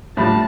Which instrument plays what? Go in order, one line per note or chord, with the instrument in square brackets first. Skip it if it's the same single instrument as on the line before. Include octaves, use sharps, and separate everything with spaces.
[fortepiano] A2 G3 D4 F4 [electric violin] A5